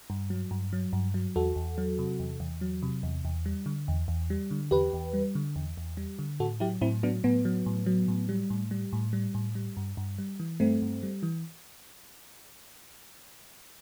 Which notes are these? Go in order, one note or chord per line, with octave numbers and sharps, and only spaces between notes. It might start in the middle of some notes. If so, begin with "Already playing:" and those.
G2
F#3
G2
F#3
G2
F#3
E2 F#4 A4
E2
F#3
C3
E2
E2
F#3
C3
E2
E2
G3
D3
E2
E2
G3
D3
E2 G4 B4
E2
G3
D3
E2
E2
G3
D3
A2 F#4 A4
F#3 E4 G4
A2 C4 E4
F#3 B3 D4
A2 B3
F#3
A2
F#3
A2
G3
A2
G3
A2
G3
A2
G3
G2
G2
G3
E3
G2 A3 C4
G2
G3
E3